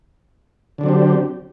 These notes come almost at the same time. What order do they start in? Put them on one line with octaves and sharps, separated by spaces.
D3 D4 F#3 C4 G4